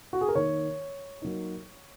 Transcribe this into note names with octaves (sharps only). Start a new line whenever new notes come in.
F#4
G#4
A#4
D#3 A#3 D#4 C#5
F#3 A#3 D#4